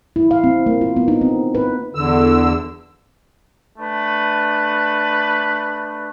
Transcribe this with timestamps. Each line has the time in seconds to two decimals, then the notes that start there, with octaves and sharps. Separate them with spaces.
0.16 E4
0.31 F5
0.44 C4
0.66 A#3
0.81 F4
0.97 B3
1.08 D#4
1.21 C4
1.55 B4
1.95 E2 D3 E6
3.78 A3 D4 B4